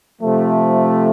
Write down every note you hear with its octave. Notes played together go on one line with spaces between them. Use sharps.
C3 F3 A3